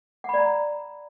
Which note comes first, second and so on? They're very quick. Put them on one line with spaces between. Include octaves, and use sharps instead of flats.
F#5 B5 D5 A#5